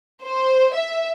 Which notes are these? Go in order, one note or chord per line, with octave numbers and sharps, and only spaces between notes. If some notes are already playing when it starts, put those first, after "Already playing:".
C5
E5